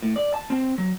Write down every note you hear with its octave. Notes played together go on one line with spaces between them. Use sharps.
A2
D5
A5
C4
F#3